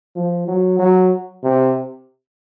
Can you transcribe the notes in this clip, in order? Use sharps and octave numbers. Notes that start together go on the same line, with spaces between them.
F3
F#3
F#3
C3